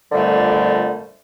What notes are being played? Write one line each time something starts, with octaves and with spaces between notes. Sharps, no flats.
F2 A#2 D3 G3 A3